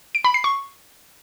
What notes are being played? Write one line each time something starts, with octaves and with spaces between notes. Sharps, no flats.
D7
B5
C7
C#6